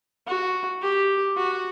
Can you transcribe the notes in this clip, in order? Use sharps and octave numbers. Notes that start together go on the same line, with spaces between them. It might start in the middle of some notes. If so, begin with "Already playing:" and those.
F#4
G4
F#4